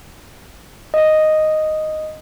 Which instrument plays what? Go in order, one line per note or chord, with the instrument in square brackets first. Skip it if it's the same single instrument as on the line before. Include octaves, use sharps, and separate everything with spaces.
[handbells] D#5